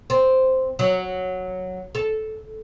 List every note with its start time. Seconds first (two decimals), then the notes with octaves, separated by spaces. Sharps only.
0.10 C4
0.79 F#3
1.95 A4